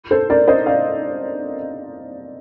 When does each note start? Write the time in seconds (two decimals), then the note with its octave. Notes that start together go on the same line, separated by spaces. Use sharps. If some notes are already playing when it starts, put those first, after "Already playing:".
0.11 A4 C5
0.30 A#4 D5
0.48 C5 D#5
0.66 D5 F5